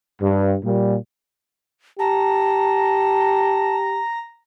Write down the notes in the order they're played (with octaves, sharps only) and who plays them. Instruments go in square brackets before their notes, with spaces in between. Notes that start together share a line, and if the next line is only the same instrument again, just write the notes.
[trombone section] G2
A#2 G3
[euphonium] G4 [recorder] A5 [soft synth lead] A#5